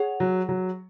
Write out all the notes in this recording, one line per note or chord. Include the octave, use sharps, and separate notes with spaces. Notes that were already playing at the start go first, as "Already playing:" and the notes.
Already playing: G#4 C#5 F#5
F#3
F#3